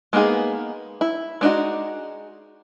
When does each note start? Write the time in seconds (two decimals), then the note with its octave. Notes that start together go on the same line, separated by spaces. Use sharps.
0.13 G#3 A#3 B3 D#4 G#4
1.01 E4
1.41 G#3 D4 D#4 F#4